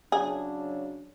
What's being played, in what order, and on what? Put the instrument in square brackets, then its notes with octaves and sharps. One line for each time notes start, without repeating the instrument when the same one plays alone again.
[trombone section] C#3 F#3 D4 [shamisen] G#4